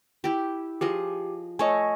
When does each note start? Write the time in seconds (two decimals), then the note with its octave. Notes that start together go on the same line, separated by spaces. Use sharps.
0.24 E4 G4
0.81 F3 G4 G#4 D#5
1.59 A3 C#5 D#5 G#5